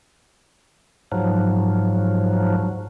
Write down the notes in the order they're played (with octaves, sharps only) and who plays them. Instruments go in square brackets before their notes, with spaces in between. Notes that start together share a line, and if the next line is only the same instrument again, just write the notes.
[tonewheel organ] G#2 F3 F#3